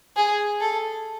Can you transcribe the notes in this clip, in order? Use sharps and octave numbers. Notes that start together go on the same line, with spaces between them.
G#4
A4